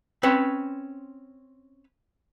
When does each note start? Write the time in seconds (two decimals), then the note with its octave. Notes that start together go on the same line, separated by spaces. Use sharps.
0.23 C4 C#4 B4 C#5